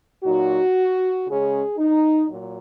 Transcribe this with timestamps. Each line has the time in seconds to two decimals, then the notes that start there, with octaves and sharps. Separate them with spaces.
0.24 A#2 F#3 D#4 F#4
1.26 C#3 G#3 C#4 G#4
1.77 D#4
2.29 A#2 F#3